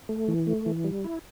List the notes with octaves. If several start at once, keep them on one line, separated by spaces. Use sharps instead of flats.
A3
E3
A3
E3
G3
E4